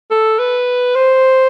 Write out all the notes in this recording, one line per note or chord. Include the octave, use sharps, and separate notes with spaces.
A4
B4
C5